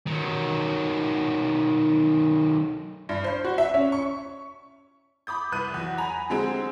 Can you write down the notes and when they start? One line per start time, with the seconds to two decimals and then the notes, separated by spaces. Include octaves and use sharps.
0.07 D#3 F#3
3.09 G2
3.24 C5
3.45 F#4
3.58 E5
3.74 C#4
3.92 C#6
5.27 B5 D6 D#6 G6
5.52 C2 B4 F#6 D#7
5.74 E2 F#3
5.98 G#5 A#5 B5
6.30 D3 G#3 C4 G4 G#4